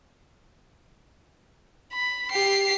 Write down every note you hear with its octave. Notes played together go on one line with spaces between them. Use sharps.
B5
G4 C7